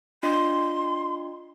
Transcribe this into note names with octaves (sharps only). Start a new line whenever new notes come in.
D4 F4 D#5 C6